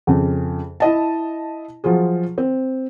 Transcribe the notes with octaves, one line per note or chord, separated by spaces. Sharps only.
F2 C#3
E4 D#5 A5
F3 F#3 F4 G#4
C4